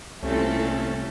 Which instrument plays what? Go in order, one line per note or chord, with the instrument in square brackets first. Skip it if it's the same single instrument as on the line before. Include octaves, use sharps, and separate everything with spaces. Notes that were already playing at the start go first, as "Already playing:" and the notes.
[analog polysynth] C2 [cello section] A#2 C4 A4 [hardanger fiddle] A3 [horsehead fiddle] C#4 E4